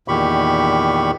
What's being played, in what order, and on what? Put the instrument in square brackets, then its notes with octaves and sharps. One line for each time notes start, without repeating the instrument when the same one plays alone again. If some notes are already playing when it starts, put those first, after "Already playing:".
[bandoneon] E2 A#2 D#3 G4 B5 C#6